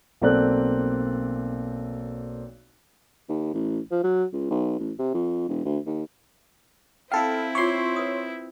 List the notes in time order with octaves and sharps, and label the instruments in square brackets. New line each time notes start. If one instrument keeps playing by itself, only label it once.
[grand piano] B1 A#3 C4 A4 D5 F#6
[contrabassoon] D#2
A1
F3
F#3
C#2
B1
A1
C3
F2
E1
D2
D#2
[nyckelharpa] C4 E4 [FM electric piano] A4 F5 [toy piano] G5 B5
[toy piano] F4 D6 [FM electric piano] C#5 C6
[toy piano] B4 D#6